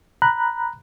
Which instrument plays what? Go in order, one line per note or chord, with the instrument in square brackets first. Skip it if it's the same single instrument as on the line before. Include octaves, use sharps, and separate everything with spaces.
[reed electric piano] A#5 B5 F#6